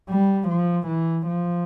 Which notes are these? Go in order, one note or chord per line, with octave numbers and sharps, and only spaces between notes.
G3
F3
E3
F3